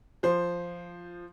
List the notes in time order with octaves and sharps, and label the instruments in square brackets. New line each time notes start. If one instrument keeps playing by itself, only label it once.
[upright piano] F3 C5